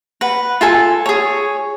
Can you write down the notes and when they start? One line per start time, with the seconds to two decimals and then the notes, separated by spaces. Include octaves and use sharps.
0.21 B4 F#5
0.61 F4 A4 G#5
1.06 G#4 C#5